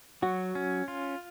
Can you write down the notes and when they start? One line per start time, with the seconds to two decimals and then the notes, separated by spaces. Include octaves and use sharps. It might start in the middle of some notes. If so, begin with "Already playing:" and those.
0.22 F#3 F#4
0.55 C#4
0.88 F4